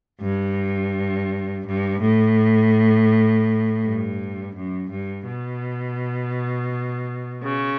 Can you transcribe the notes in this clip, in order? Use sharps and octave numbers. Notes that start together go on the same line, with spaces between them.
G2
G2
A2
G2
F#2
G2
B2
C#3